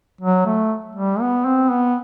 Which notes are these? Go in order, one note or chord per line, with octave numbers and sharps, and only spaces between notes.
F#3
A3
G3
B3
C4
B3